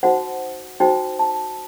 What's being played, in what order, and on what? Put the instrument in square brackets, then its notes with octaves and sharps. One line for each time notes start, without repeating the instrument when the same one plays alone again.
[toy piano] D#4 F#4 C5 F#5
D#4 F#4 C5 G5
A5